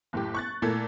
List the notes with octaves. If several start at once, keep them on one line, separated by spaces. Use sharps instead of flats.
F#1 A2 G4
C#6 F#6 A6
A#2 A3 E4 A4 G#6